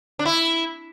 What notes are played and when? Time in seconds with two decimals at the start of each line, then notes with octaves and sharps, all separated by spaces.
0.19 D4
0.25 E4